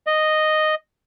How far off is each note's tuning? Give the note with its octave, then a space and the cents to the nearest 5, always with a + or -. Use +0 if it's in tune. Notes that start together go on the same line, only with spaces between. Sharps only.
D#5 -5